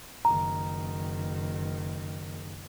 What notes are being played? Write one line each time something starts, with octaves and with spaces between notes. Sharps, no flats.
F#1 D#3 A#5